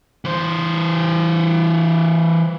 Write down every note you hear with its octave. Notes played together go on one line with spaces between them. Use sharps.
E3 C5